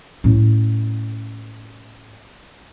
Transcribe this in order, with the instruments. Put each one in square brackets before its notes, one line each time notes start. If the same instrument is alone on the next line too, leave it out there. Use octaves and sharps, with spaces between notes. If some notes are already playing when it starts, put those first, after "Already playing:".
[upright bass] A2 C#4